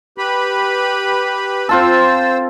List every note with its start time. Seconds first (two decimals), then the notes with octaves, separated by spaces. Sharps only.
0.18 G4 B4 B5
1.69 C4 F4 A4 C5 E6